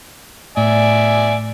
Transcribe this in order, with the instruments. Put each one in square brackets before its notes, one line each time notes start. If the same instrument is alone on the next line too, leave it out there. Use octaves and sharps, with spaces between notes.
[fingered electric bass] A2 [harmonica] D5 E5 G#5